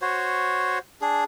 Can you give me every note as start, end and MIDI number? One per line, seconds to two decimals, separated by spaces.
0.02 0.79 66
0.02 0.79 72
0.02 0.79 73
1.02 1.24 62
1.02 1.24 68